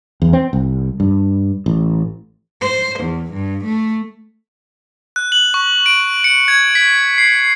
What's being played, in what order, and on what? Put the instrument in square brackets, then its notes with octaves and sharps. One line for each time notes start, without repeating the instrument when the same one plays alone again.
[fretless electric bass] E2
C4
C2
G2
A1
[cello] C5
E2
G2
A3
[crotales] F#6
F#7
C#6
D7
C#7
G#6
B6
C7